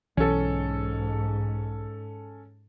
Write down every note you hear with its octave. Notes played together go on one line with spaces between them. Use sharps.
B1 G#2 E3 C#4 A4